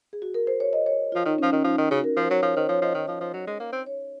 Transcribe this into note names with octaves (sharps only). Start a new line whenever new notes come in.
G#4
F#4
A#4
C5
C#5
D#5
C#5
F3 F4
D#3 D#4
F3 C#4
D#3 C#4
F3 D#4
D#3
C#3 F#4
A#4
F3 C5
F#3 C#5
F3 C#5
D#3 C5
F3 C#5
F3 D#5
D#3
F3
F3
F#3
G#3
A#3
C4
C#5